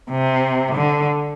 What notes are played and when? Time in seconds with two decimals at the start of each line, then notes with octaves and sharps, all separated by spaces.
0.10 C3
0.75 D3